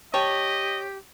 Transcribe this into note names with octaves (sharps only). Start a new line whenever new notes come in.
G4 C#5 D#5 G5 A5